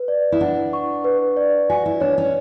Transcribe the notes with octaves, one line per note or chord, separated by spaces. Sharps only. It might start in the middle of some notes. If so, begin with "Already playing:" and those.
Already playing: B4
D5
E4
D4 F#5
C#6
B4
D5
F#4 G#5
E4
D4 C#5
C#4